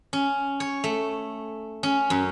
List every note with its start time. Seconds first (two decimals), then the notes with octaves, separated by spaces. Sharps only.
0.13 C#4
0.60 C#5
0.84 A3
1.83 C#4
2.10 F#2